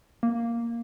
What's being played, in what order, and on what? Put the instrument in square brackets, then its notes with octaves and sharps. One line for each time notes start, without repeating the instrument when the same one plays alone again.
[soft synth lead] A#3